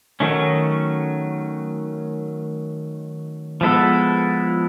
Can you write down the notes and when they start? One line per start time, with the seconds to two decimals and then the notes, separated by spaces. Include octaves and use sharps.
0.20 D#3 F#3 A3 C#4
3.61 F3 G#3 B3 E4 A4